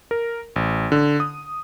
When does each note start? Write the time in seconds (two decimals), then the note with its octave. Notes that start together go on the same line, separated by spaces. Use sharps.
0.11 A#4
0.56 A1
0.92 D3
1.20 D#6